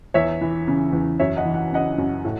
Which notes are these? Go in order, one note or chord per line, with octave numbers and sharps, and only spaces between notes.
E2 C#5 E5
E3
C#3
E2
F#2 C#5 E5
D#5 F#5
E3
F#5
C#3 D#5 F#5
F#2
A2